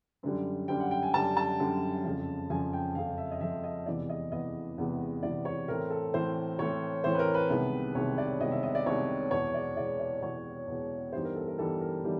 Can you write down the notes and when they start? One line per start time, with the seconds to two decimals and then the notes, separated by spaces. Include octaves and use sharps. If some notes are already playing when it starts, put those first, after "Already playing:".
0.23 F#2 D3 G3
0.68 F#2 D3 G3 G5
0.80 F#5
0.91 G5
1.03 G#5
1.14 F#2 D3 G3 A5
1.37 A5
1.60 F#2 D3 G3
2.04 F2 C#3 F3
2.50 F2 C#3 F3 G#5
2.73 G5
2.95 F2 C#3 F3 F5
3.18 E5
3.31 D#5
3.41 F2 C#3 F3 E5
3.64 D#5
3.86 E2 C3 E3 G#3 B3 D5
4.09 D#5
4.31 E2 C3 E3 G#3 B3 D#5
4.78 E2 C3 E3 G#3 B3
5.22 E2 C3 E3 G#3 B3 D5
5.45 C#5
5.68 A2 E3 A3 C4 A#4
5.90 A4
6.14 A2 E3 A3 C4 C5
6.59 A2 E3 A3 C4 C#5
7.04 A2 E3 A3 C4 C5
7.14 B4
7.19 A#4
7.34 B4
7.50 C2 C3 D#3 G#3 B3
7.95 C2 C3 D#3 G#3 B3 C#5
8.18 D5
8.41 C2 C3 D#3 G#3 B3 D#5
8.51 E5
8.63 D#5
8.75 D5
8.86 C2 C3 D#3 G#3 B3 C#5
9.31 E2 B2 G#3 C#5
9.54 D5
9.77 E2 B2 G#3 D5
9.99 D5
10.22 E2 B2 G#3 C#5
10.68 E2 B2 G#3
11.13 G2 E3 G3 B3 D#4 C5
11.24 A#4
11.36 A4
11.48 A#4
11.58 G2 E3 G3 B3 D#4 A4
11.81 A#4
12.04 E3 G3 B3 D#4